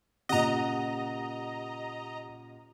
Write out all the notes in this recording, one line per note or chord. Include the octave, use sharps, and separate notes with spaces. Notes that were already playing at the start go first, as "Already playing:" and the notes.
A#2 C#3 G4 D#5 F#5 A#5